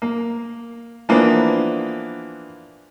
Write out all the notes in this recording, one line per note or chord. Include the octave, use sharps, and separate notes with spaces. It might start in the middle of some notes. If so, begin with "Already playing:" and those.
A#3
E3 F3 A#3 B3 D4